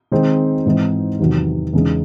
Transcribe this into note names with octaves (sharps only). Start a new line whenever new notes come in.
D#3 G#3 C4 D#4
G#2 E3 C4 D#4
E2 C3 D#3 F#3
E2 C#3 G#3 D#4